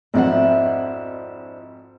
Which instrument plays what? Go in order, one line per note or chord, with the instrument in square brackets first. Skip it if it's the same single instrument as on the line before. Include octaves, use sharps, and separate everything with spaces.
[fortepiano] G#1 F2 F#5 [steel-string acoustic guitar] D4 E4 C5